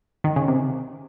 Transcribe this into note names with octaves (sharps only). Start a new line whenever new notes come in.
D#3
C#3
C3